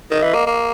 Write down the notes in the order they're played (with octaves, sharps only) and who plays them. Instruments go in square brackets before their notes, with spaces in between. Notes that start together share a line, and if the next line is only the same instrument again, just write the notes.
[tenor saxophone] D#3 [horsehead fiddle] D#5
[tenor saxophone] E3
A#3
A#3